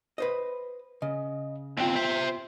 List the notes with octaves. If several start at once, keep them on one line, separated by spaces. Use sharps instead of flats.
B4 C5 D#5
C#3 D#5
D#2 B3 C4 F4
C5 E5